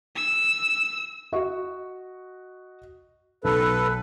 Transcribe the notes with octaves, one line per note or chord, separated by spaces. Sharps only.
E6
F#4 D#5 C#6
B1 A4 B4